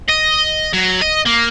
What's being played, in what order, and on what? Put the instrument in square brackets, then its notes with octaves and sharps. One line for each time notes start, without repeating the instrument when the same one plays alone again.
[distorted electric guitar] D#5
F#3
D#5
A#3